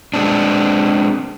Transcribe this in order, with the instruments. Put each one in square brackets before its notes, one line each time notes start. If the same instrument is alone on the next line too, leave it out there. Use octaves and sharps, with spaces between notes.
[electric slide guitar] G#3 C4 D4